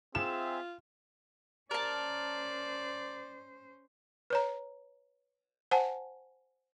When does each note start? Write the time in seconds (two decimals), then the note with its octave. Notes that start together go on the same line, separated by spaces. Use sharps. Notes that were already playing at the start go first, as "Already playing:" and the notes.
0.15 C4 F4 G#4 E5 E7
1.71 C#4 A#4 C5 D5 A5
4.30 B4 C#5 A#5
5.71 C5 F#5 G#5 A5